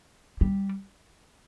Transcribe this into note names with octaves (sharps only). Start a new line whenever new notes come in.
G3